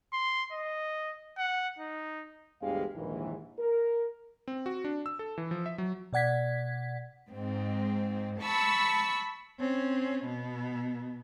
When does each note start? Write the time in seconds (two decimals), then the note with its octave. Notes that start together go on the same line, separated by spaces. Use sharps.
0.13 C6
0.52 D#5
1.38 F#5
1.79 D#4
2.61 G1 D2 E3 G#3 G4 F5
2.95 A#1 D#2 G#2 D#3 E3
3.59 A#4
4.48 C4
4.66 F#4
4.84 D4
5.06 E6
5.19 A4
5.38 E3
5.51 F3
5.66 E5
5.78 F#3
6.13 B2 D5 F#5 G#6 B6
7.31 G#2 C4
8.41 A5 B5 C#6 E6
9.60 C4 C#4
10.25 B2 B3